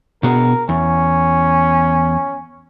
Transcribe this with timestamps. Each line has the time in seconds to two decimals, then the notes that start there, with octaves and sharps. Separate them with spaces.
0.23 B2 B3 G#4 A#4
0.69 E2 C#4